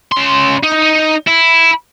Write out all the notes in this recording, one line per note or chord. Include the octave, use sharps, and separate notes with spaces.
C#3 C6
D#4
E4